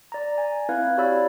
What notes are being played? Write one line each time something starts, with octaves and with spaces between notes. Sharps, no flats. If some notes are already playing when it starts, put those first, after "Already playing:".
D5 A#5
G#5
C4 E4 B4 F5 G#6
F#4 G4 C#5 D5 B5 E6